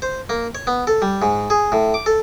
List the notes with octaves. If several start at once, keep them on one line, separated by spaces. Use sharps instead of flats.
C5
A#3
C#5
B3
A4
G3
G#2
G#4
A2
D6
A4